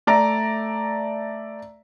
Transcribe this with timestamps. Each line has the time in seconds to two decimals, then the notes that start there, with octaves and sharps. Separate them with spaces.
0.07 A3 D5 E5 A#5